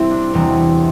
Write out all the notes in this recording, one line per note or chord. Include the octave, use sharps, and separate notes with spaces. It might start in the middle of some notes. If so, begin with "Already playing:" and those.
Already playing: C2 C3 G3 C4 E4
D4
E1 E2 C3 G3 C4